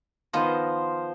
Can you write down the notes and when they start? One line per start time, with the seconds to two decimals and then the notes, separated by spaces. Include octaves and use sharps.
0.33 D#3 F3 B3 C5 D#5